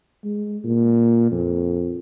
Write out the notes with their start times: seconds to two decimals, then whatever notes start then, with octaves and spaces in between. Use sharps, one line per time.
0.24 G#3
0.64 A#2
1.31 F2